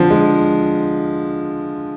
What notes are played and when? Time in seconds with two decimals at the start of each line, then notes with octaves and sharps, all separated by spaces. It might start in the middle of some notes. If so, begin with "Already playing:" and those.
Already playing: D3 F3
0.10 G#3